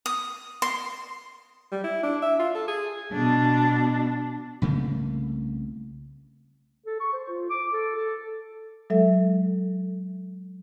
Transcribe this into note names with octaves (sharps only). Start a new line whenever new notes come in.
D#6
C6
G3
E4
D4
E5
F4
A4
G#4
B2 D4
C2 C#3 A3 A#3
A4
C#6
C5
F4
D6
A4
A4
A4
F#3 G#3 A4 E5